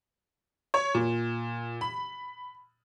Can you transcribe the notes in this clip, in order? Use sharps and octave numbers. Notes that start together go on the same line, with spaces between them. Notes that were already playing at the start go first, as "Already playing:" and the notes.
C#5
A#2
B5